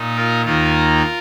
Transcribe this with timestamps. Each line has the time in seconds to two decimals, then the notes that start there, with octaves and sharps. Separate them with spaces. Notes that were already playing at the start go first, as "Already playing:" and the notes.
Already playing: A#2 A#3 D#4
0.16 F4 A#4
0.45 D#2 D#3 A#3 D#4 F4 A#4